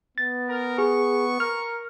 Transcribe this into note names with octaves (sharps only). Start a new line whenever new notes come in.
B3 A6
A#4
G#4 C#6
A#4 F6